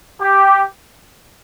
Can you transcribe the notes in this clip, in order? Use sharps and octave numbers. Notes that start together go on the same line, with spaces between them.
G4